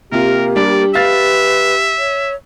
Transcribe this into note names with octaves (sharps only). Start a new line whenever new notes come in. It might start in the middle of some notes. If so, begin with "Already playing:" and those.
C3 A#3 F4 G4 A#4
G3 D4 D5
B4 E5 F5 A6
C#5